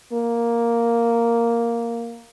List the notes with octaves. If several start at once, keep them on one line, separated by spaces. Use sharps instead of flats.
A#3